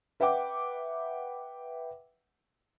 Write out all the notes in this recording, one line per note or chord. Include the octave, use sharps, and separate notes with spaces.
B4 E5 F#5 G5 D6